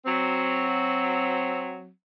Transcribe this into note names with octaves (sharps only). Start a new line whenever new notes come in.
F#3 C4